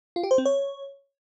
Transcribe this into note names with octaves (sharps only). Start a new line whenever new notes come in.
F4
G4
C5
C4
C#5